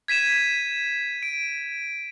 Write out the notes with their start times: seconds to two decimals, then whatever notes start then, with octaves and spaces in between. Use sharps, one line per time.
0.08 G#6 B6 D#7 E7
1.23 D7